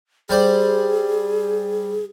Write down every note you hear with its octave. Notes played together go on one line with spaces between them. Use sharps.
G3 G#4 C5 D5